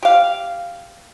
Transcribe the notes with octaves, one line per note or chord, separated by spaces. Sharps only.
G4 F5